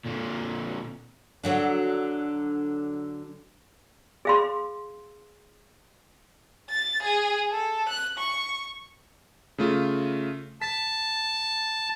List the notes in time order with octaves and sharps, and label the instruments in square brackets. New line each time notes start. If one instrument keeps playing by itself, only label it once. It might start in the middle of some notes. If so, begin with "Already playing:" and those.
[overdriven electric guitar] A#2 D3
[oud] D3 F#3 D4
[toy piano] G#4 F5 C6
[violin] A6
G#4
A4
F#6
C#6
[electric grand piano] C#3 A3 F4
[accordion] A5 [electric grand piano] B6